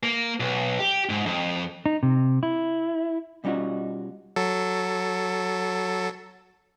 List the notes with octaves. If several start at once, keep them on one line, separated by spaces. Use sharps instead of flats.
A#3
B1
G4
G#2
F2
D#4
C3
E4
B2 G3 C#4 D#4 F4 F#4
F#3 A4